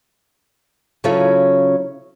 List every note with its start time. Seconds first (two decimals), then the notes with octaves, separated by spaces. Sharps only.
1.04 C#3 F#3 C#4 E4 F4 A4